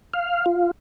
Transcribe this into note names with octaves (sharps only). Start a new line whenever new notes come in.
F5
F4